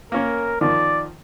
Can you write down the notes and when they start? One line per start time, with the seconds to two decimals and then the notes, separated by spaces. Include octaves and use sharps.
0.12 A#3 C#4 A#4
0.61 D#3 F3 D5